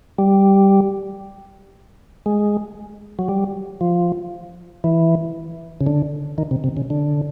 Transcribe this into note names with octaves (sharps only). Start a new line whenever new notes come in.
G3
G#3
F#3
G3
F3
E3
C#3
D3
D#3
C3
C3
C#3
D3